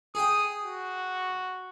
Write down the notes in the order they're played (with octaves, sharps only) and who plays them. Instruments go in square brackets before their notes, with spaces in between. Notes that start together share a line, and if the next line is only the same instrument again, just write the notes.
[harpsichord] G#4 G5 [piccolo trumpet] D#6
[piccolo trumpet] F#4